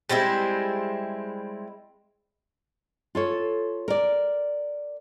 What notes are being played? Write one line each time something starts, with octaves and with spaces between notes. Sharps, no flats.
G3 G#3 C4 E4
F4 A4 C#5
A#4 D5